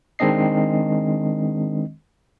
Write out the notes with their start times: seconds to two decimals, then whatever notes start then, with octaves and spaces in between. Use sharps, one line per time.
0.19 D#3 G#3 C4 D4 D#5 C7